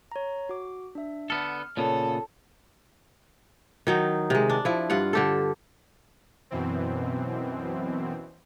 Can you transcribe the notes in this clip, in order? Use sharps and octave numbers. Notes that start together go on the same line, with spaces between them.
C#5 A#5
F#4 D6
D4 E5
D3 B3 A4 F6
A#2 C#3 B3 A4 C#5
D#3 F#3 D#4
C3 G#3
D4
F3 E4
G2 F4 F#5
D3 G4 A4
F#2 B2 E3 C4